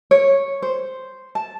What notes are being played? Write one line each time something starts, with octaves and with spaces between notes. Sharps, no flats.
C#5
C5
A5